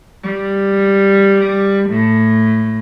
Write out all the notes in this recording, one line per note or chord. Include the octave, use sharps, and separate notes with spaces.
G3
A2